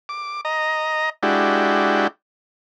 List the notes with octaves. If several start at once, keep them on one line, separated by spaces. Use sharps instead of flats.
D6
D#5 A#5
G#3 D4 E4 F#4 G4